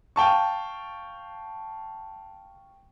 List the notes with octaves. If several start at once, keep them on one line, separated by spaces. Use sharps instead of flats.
F5 G5 A5 C#6